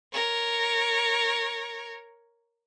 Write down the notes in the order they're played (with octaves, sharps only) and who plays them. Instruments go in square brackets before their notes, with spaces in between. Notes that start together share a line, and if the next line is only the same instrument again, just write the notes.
[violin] A#4 C#5